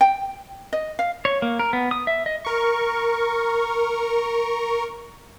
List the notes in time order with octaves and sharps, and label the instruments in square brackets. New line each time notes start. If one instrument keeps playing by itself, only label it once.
[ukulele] G5
D#5
F5
[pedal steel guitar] C#5
A#3
A#4
B3
D#6
E5
D#5
[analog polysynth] A#4 C#6